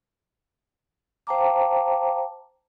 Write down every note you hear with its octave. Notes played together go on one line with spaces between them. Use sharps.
C5 F5 G5 A5 A#5 D6